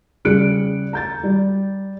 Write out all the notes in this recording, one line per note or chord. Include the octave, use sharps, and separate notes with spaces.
C#3 G3 G#4 F#6 C#7 D7
A#5 G6 A6
G3